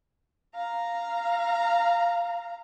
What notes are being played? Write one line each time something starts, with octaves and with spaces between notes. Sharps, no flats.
F5 A#5